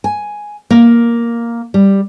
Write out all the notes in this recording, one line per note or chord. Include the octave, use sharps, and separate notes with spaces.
G#5
A#3
G3